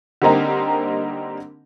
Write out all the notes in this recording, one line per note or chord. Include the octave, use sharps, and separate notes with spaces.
D3 G3 A#3 C4 D#4 A#4